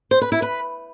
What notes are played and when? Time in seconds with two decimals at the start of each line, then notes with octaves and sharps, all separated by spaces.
0.11 C5
0.21 B4
0.32 E4
0.42 B4